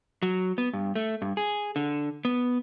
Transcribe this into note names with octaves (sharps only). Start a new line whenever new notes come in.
F#3
B3
G2
A3
G2
G#4
D3
B3